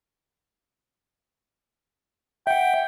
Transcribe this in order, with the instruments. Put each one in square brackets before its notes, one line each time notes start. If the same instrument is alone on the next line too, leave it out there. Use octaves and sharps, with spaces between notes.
[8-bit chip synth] E5 F#5 [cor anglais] G5